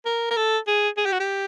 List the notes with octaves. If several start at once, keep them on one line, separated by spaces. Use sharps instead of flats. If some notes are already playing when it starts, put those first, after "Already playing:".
A#4
A#4
A4
G#4
G#4
G4
F#4
G4